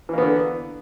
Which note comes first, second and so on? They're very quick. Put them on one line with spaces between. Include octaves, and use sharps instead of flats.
E3 A#3 B3 D3